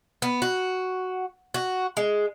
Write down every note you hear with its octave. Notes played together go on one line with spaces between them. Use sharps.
B3
F#4
F#4
G#3